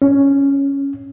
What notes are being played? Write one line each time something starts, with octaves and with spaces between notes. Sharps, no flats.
C#4